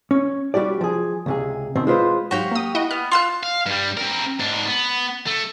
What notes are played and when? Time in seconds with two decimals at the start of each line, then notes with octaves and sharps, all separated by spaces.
0.11 C#4
0.54 G3 F#4 G4 D5
0.81 F3 G#4
1.26 C#2 C3 G#4
1.75 B2 D#3 C4
1.87 G#3 F4 B4 C5
2.31 G#2 F#3 F#4 G4 F5
2.51 A#3 D#6
2.75 E4 D#5 F#5
2.91 B3 F6
3.11 F4 F5 C6 F#6 E7
3.43 F5
3.66 G2 G3
3.97 C4 A#4
4.39 G#2 D4
4.67 B3
5.26 A3